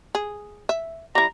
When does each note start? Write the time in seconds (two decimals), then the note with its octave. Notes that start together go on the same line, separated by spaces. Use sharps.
0.15 G#4
0.69 E5
1.15 G3 E4 A#5